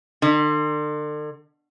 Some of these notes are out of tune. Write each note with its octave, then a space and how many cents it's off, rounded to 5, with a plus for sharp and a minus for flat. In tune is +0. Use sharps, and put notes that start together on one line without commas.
D3 +40